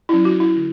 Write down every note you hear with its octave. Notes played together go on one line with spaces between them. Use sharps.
F#3 C#4 E4
F#4
E4
D3